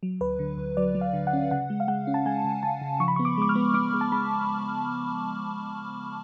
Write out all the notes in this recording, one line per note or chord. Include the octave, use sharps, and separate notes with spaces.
F#3
D2 B4
D3
D2
F#3 D5
F#3
F5
D3
F#5
C#4
C#3 F#5
G#3
F5
G#3 F#5
C#4
A5
G#3 G#5
C#3
C#3 A5
C#3
F3 C#6
B5
C#6
B3
D6
G#3 D6
F6
B3
B3 D6
G#3
A5
G#3 B5